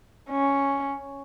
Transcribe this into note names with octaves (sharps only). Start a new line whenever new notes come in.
C#4